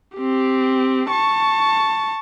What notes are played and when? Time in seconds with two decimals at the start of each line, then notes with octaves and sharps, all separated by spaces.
0.18 C4 G4
1.09 A5 C#6